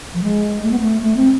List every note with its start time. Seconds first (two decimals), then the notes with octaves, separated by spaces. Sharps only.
0.14 F3
0.23 G#3
0.63 A3
0.71 B3
0.80 A3
1.02 A3
1.17 C4